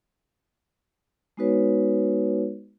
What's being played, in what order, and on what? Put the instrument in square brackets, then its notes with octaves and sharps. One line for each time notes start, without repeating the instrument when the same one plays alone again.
[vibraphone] G#3 B3 D#4 F#4 B4 C#5